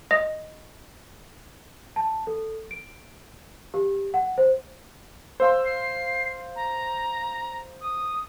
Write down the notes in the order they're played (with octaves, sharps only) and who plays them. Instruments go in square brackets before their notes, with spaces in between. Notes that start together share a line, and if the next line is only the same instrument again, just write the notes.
[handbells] D#5
[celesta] A5
A4
D7
G4
F#5
C5
[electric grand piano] C5 F5 C6 [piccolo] E6
[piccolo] C7
A#5
D#6